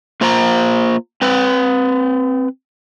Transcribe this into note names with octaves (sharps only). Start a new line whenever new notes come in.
A#3 F4 C5 A#5
C4 B4